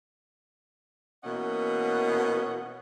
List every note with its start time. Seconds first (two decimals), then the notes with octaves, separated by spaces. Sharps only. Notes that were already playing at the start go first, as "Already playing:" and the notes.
1.24 B2 E3 A#3 C#4 D#5 F#5